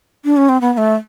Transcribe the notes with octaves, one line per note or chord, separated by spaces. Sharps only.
D4
C#4
C4
B3
B3
A3